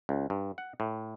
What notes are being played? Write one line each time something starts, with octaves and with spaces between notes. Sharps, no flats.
C#2
G2
F#5
A2